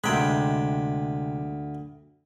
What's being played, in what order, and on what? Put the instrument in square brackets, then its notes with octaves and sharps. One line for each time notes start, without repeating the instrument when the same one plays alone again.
[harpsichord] D2 G5 B5 [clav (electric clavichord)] C3 G#3